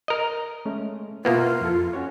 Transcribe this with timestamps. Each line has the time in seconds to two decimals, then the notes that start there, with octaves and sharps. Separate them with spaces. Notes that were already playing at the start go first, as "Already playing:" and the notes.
0.08 A#4 D#5
0.65 G#3 A3 C#4
1.25 B2 A#3 B3 E4 F4
1.61 F2 A4
1.93 C#4 F#4 C#5